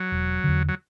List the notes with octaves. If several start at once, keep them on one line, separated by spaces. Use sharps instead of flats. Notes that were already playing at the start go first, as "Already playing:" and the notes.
Already playing: F#3
E1
E2 D3
F#3